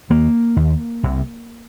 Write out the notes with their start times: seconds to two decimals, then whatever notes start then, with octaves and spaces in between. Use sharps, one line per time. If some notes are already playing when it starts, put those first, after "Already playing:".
0.10 D#2 A#3
0.56 D#2
1.03 C2 C3